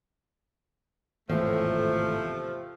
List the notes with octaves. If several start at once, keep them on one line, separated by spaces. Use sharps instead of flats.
G#1 E2 A2 C3 F3 A3